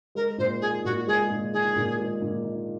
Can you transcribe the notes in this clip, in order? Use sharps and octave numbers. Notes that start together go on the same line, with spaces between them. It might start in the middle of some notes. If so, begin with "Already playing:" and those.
G#3 A#4
A#2 C5
D#4 G#4
A#2 F#4
G#3 G#4
A#2
D#4 G#4
A#2
G#3
A#2
D#4